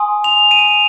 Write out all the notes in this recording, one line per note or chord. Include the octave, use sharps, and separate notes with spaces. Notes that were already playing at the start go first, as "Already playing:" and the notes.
Already playing: G#5 C6 D#6
F7
D#7
F7